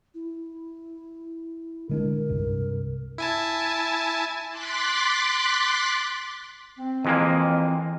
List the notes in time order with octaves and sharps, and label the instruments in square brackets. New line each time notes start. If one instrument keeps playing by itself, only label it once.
[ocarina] E4
[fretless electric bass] D3 G#3 D4 [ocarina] A#4
[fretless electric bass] C2 G2 C3
[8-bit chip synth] E4 G#5 A5
[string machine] C6 D6 F#6 A6 B6
[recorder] C4
[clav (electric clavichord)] F2 G#3 A#3 [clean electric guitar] E3